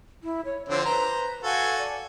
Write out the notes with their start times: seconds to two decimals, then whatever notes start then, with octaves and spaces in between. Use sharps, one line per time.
0.23 E4
0.45 C#5
0.69 D3 F3 C4 C#5
0.85 B4 C5 A#5
1.44 F#4 A4 F5 G#5
1.78 D5